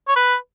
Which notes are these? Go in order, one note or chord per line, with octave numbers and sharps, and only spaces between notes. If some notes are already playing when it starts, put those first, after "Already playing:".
C#5
B4